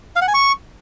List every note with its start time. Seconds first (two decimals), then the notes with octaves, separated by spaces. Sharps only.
0.16 F5
0.22 F#5
0.28 G#5
0.34 C#6